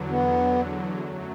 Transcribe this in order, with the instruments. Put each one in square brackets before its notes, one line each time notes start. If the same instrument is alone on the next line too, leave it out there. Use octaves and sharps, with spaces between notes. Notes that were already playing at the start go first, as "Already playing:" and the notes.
Already playing: [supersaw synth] E2 D3 F#3
[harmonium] B3
[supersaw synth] F#2 F#3 A3